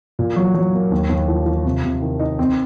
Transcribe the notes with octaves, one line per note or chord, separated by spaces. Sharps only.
A#2
F#3
F#3
A#3
D#2
D#2
F3
F3
C3
C3
D#3
D#4
C4